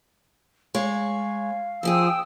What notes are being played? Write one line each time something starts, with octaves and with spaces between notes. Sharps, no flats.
G#3 C#5 F5
F2 F3 G4 G#4 G5 D#6 E6